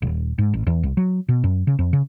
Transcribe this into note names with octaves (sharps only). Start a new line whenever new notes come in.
D#1
G#2
A1
E2
C2
F#3
B2
F#2
C#3
F2
C#3